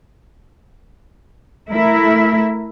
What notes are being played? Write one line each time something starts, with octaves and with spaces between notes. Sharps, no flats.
A3 E4 A#4 E5